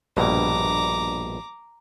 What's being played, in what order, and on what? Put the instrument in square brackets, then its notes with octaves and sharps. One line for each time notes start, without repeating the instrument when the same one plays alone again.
[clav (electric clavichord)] A#1 G2 B2 [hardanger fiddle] A#5 D6